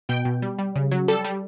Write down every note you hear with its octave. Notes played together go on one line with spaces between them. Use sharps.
B2 G5
B2
G3
G3
C#3
F#3
G3 A4
G3